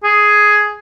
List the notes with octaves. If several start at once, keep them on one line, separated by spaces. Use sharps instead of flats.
G#4